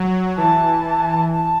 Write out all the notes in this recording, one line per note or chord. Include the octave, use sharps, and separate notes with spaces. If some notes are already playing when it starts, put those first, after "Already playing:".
Already playing: F#3
E3 A5
A5